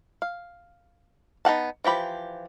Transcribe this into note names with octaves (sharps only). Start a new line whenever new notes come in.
F5
B3 D#4 F#5 A5
E3 F3 G4 B5